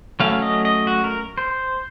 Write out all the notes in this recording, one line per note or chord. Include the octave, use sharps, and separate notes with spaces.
F#3 A3 C#4 F5
D#5
D#5
F#4
A#4
C5